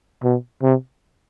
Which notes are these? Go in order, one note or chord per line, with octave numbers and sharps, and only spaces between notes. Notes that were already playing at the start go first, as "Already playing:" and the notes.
B2
C3